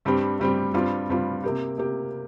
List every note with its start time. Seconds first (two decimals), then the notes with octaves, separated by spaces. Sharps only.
0.05 G2 G3 C4 G4
0.40 G2 G3 C4 G4
0.74 G2 G3 C4 F4
1.09 G2 G3 C4 F4
1.44 C3 A#3 G4
1.78 C3 A#3 G4